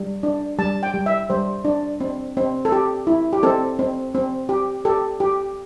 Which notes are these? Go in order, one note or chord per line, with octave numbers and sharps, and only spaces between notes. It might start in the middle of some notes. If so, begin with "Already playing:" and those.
Already playing: G3
D4
G3 A5
G5
G3
E5
G3 C5
D4
C4
C4
A4
G4
E4
G4
C4 A4
C4
C4
G4
G4 A4
G4